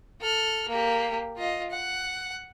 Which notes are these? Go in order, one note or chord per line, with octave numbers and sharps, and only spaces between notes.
A4 F6
A#3 G4
F4 D#5
F#5